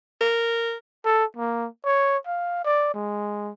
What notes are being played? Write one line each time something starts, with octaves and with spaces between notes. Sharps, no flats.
A#4
A4
A#3
C#5
F5
D5
G#3